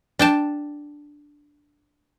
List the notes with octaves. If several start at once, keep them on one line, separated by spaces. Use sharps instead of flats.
D4 G5 A5